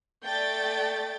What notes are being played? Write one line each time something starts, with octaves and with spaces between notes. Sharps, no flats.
A3 D5 G5 G6 A6